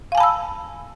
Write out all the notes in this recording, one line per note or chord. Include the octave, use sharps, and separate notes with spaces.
F5 G#5 A5 B5 E6